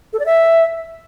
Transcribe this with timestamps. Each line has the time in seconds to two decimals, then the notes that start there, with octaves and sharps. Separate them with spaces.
0.13 A4
0.19 D5
0.26 E5